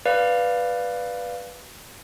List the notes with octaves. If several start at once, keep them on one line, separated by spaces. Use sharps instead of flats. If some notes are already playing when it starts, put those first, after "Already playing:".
B4 D5 F5